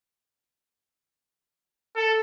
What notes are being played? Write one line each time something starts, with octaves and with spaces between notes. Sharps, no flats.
A4